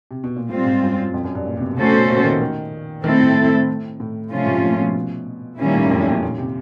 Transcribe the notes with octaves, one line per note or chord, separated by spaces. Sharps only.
C3
B2
A#2
A2 G3 C4 F4
G#2
F#2
F2
F#2
G2
A#2
C3
B2
C#3 A3 C#4 F#4 A4 C5
B2
A#2
D#3
D#3
D#3 A3 C4 E4 A4
A2
A2
C3 F3 A3 C#4 F4
G#2
A2
A#2
B2
A#2 D#3 G3 A#3 C#4 E4
A2
F#2
F2
F2
A#2
C3